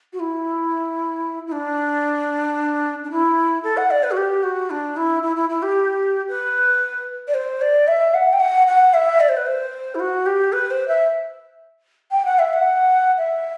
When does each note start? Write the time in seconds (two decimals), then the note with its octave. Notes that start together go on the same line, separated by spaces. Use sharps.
0.13 F#4
0.20 E4
1.47 E4
1.52 D4
3.04 D4
3.11 E4
3.63 A4
3.77 F#5
3.91 D5
4.03 B4
4.11 F#4
4.17 G4
4.43 F#4
4.70 D4
4.96 E4
5.23 E4
5.36 E4
5.49 E4
5.62 G4
6.28 B4
7.28 D5
7.34 C5
7.61 D5
7.87 E5
8.14 F#5
8.33 G5
8.40 F#5
8.67 F#5
8.94 E5
9.20 D5
9.29 C5
9.37 B4
9.46 C5
9.95 E4
9.99 F#4
10.26 G4
10.52 B4
10.70 C5
10.88 E5
12.11 G5
12.25 F#5
12.39 E5
12.53 F#5
13.18 E5